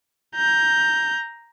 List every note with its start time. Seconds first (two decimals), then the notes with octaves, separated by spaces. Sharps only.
0.36 A#5 G6